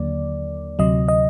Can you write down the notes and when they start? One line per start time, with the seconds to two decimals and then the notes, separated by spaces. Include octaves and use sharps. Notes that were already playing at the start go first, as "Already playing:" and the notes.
Already playing: D#2 D3 F#3 A#3 D5
0.79 D2 C3 F#3 D#5
1.08 D#5